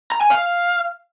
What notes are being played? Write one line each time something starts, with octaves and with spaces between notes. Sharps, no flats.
A#5
G#5
F5